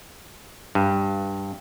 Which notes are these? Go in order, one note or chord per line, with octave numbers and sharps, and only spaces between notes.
G2